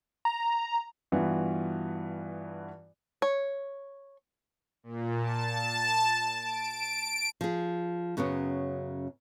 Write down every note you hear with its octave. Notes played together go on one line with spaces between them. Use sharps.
A#5
G2 E3 B3 F4 F#4
C#5
A#2
A5
D7
F3 G#4
F#2 C#3 F#3 B3 C#4